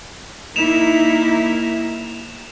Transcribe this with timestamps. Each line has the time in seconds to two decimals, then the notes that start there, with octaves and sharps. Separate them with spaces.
0.56 A#3 D#4 E4 E7 F7